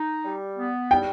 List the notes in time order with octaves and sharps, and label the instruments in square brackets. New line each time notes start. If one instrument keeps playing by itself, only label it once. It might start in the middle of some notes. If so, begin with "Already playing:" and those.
Already playing: [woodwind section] D#4
G3
B3
[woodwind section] G3 [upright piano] G5